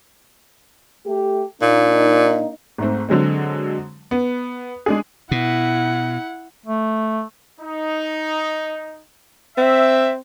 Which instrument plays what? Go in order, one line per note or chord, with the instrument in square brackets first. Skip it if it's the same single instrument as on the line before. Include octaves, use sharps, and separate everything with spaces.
[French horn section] A3 G4
[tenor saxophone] A#2 [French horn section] A#3 D4 D#4
[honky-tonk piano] G#2 A3 C4
D3 F#3 G#3 C4
B3
G#3 D4 G#4
[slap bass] B2 [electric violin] E4 F#5
[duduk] A3
[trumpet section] D#4
[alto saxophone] C4 [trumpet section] E5